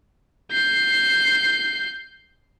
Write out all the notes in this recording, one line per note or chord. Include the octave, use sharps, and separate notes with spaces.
G6 C7